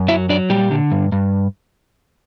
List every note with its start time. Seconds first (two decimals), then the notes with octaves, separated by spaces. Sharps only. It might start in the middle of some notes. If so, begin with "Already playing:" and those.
Already playing: F#2
0.08 F#3 E4 E5
0.29 F#3 D4 D5
0.50 A#2 G3 G4
0.71 D3
0.91 G2
1.12 G2